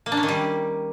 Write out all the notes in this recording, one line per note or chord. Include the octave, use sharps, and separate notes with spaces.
A#3
D4
C#4
D#3
G3